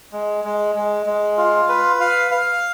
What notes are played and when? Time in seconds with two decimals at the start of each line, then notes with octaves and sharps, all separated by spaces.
0.12 G#3
0.44 G#3
0.75 G#3
1.06 G#3
1.38 F4
1.69 B4
2.00 F5
2.31 F5